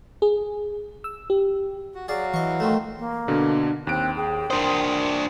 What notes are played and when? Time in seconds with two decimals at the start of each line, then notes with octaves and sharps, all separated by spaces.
0.22 G#4
1.04 E6
1.30 G4
1.95 F#4
2.08 F#3 F#4 G#4 D5 F5
2.34 E3 D#5 C#6
2.60 D#3 F3 A3
2.98 A#3
3.28 B2 D3 D4
3.87 D#2 C4 F#6 D7
4.16 G#4 G5
4.51 D4 A#4 C5 C6 D#6